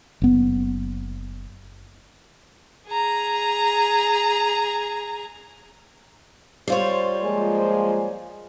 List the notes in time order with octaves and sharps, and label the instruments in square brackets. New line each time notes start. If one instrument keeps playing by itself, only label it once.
[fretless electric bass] F#1 B3
[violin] G#4 A#5
[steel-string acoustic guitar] G3 F4 C#5 [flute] C5
[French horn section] F3 A#3 C5 [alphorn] G#3 [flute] G#5